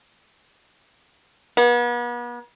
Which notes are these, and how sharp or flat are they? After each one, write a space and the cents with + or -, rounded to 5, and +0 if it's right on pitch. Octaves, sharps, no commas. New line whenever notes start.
B3 -40